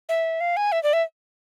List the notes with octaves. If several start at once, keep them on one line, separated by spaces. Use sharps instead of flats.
E5
F5
G#5
E5
D5
E5